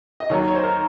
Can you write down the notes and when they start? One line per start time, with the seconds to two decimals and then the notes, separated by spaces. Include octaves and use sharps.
0.20 D#5
0.30 D#2 D#3 F#3 C#5
0.48 C#5
0.55 C5
0.63 A#4